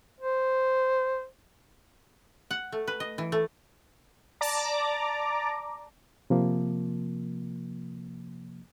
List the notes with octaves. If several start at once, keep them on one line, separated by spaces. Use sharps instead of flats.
C5
F#5
A3
B4
D#5
E3
A3
D5 A5 A#5 D6
C3 F3 A#3